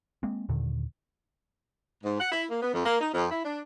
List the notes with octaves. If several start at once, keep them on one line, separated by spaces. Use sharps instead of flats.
G#3 A#3 C4
D#2 A#2 D3 D#3
G#2
F#5
E4
A#3
B3
F2
A#3
D#4
F2
E4
D4